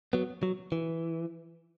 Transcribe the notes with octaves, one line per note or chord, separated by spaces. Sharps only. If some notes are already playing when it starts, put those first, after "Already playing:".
F#3 B3
F#3
E3